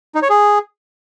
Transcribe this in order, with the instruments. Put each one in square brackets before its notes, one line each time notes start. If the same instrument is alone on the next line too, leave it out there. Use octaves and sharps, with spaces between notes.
[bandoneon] D#4
C#5
G#4